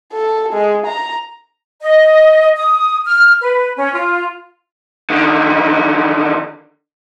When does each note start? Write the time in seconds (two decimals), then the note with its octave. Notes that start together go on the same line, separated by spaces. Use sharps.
0.13 A4
0.53 G#3
0.86 A#5
1.81 D#5
2.56 D#6
3.04 F6
3.41 B4
3.76 C#4
3.93 F4
5.10 D3 D#3